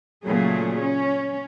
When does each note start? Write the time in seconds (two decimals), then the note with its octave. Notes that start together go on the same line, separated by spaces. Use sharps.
0.23 A#2 C#3 F#3 A3 G#4
0.78 C#4